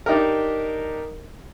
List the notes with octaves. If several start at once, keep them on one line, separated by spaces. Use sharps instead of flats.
D4 D#4 G4 A#4